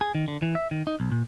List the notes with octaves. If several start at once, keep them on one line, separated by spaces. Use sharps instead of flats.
G#4
D#3
D3
E3
E5
D#3
D#4
B1
A#2